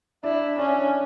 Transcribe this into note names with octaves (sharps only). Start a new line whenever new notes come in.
D4 E4
C#4 D4